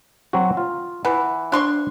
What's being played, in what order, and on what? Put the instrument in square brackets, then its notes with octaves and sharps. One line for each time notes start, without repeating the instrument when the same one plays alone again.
[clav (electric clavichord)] F#3 C4 F#4
F4
[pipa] E3 [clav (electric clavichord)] B4 F#5
[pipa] D4 C6 C#6